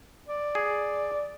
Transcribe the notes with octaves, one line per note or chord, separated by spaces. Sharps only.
D5
G#4